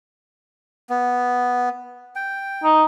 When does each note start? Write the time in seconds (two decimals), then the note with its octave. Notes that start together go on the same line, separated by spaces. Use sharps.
0.90 B3
2.16 G5
2.64 D#4